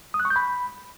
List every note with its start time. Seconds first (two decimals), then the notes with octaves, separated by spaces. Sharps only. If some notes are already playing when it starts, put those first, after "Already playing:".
0.14 D#6
0.20 F#6
0.25 C#6
0.30 G6
0.36 B5